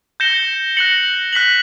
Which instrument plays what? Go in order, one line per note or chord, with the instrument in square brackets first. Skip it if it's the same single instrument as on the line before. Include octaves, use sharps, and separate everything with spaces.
[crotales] G6 A#6 C#7 E7 G7
F#6 A#6 C#7 F#7
F#6 B6 F#7